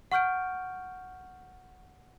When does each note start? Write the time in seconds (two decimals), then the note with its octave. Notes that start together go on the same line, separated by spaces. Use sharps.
0.12 F#5 C#6 F6 G6 D7